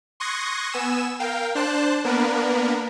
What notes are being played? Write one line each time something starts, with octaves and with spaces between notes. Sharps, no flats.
C6 C#6 D#6 F#6 G#6 A#6
B3 G#5 E6 E7
A#4 F5 G5
D4 C5 A5 F#6
A#3 B3 D4 A#4 B4